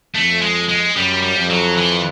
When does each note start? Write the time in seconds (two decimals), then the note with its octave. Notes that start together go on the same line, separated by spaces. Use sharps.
0.15 F2 A3
0.42 G#3
0.69 G#3
0.95 F#2 G3
1.22 G3
1.36 F2
1.50 F#3
1.76 E3